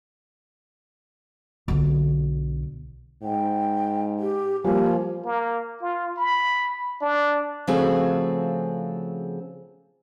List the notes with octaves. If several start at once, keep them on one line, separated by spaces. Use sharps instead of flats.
B1 D3
G#2 G5
G4
F3 G3 A#3 G#5
A#3
F4
B5
D4
C#3 F3 A3 C4 F#4 G#4